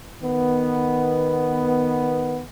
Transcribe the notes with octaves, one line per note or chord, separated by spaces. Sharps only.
D#3 B3